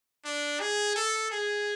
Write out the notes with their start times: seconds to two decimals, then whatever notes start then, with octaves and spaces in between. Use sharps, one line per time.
0.25 D4
0.60 G#4
0.96 A4
1.31 G#4